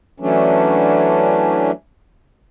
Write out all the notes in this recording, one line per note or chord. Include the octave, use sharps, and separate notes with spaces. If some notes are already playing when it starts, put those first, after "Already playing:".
E3 F#3 A3 C#4 D4